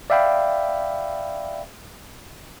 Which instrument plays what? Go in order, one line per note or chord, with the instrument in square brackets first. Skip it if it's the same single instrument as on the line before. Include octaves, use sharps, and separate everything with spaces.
[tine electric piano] D5 E5 F5 G5 B5